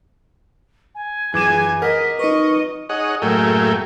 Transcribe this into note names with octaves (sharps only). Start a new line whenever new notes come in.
G#5
F#2 E3 G#4 G#5 D6 G#6 E7
A#4 D#5 F#5 B6
D#4 B4 D#5 C#6
D#4 G#4 C#5 D#5 F#5
F#2 A2 A3 A#3 G#4 G5